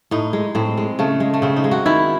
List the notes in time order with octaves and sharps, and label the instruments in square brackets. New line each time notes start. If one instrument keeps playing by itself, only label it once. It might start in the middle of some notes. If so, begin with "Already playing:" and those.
[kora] A2 D#4
G#3
A2 C4
G#3
C#3 A3
G#3
A3
C#3 C4
D#4
G#3
F#4
D#3 E4